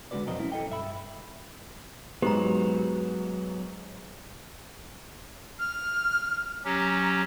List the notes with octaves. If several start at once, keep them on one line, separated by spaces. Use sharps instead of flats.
D3 G#3 C#4 F#4 B4 D5
B1 F2 C4 F#4 A#4 D#5
C#4 E4
A4 D#5 G5
G2 E5 B5
G#2 F#3 B3 G4 A#5
F6
F#3 C#4 G4 A#5